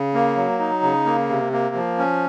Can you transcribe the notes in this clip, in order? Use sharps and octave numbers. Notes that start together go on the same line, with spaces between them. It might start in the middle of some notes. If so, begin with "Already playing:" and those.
Already playing: C#3
A#3
F#3
D#4
C#3
A#3
C3
A#3
F3
C#4